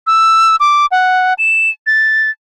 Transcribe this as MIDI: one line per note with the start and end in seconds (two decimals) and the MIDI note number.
0.07 0.56 88
0.60 0.86 86
0.92 1.34 78
1.38 1.70 100
1.87 2.30 93